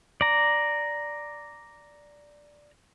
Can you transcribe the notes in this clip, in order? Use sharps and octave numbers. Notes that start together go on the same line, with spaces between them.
D5 A#5